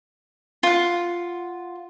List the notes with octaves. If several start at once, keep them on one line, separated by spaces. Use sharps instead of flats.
F4 F#5